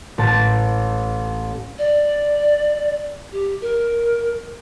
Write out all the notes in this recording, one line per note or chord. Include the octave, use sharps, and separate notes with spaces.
A1 A5
D5
G4
A#4